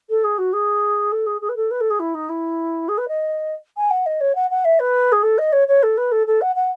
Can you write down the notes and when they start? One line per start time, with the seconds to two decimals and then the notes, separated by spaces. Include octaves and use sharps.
0.09 A4
0.24 G#4
0.38 F#4
0.53 G#4
1.12 A4
1.26 G#4
1.41 G#4
1.49 B4
1.56 A4
1.71 B4
1.80 A4
1.90 G#4
1.99 E4
2.14 D#4
2.29 E4
2.88 G#4
2.98 B4
3.08 D#5
3.77 G#5
3.90 F#5
4.06 D#5
4.20 C#5
4.35 F#5
4.50 F#5
4.64 E5
4.79 B4
5.12 G#4
5.23 A4
5.38 D#5
5.52 C#5
5.68 C#5
5.83 A4
5.97 B4
6.11 A4
6.27 A4
6.41 F#5
6.55 F#5